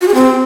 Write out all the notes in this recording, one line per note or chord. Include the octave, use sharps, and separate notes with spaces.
F#4
G#4
C4